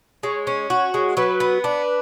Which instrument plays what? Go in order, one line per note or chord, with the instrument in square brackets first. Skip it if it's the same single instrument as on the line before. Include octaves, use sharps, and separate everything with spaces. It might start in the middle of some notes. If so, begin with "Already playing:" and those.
[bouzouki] G#3 [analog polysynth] C#5
[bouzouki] C#4
F#4
G#3
[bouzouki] F#3 [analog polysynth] B4
[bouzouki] B3
D4